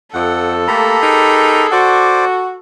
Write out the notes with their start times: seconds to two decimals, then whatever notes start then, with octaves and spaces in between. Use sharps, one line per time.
0.14 F2 A4 F#5
0.68 A3 A#3 G4 A#5 B5
1.02 D#4 G#4 A#4
1.72 F#4 C5 D5 D6